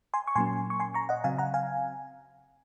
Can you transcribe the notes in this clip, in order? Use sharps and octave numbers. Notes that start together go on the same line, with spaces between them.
G#5 C6
C#6
A#2 F#3 A#3 C#4 G#5 C6
C#6
G#5 C6
A#5 C#6
D#5 F#5
C#3 F#3 C4 F5 G#5
F#5 A#5
F5 G#5